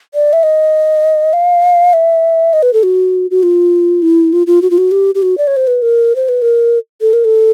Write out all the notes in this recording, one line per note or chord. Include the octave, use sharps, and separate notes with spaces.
D5
E5
D#5
F5
E5
D#5
B4
A4
F#4
F#4
F4
E4
F4
F4
F#4
F4
F#4
G4
G4
F#4
D5
C#5
C5
B4
A#4
C5
B4
A#4
A4
A#4
A4